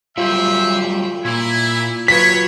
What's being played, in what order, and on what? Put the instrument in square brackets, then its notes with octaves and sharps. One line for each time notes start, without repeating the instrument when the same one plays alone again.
[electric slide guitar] F#3 G3 A3 [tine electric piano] F4 [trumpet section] C5 E5
[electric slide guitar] A#2 A#3 [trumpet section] E4
[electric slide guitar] F#3 [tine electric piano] F4 B4 [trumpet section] C#5 [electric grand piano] B6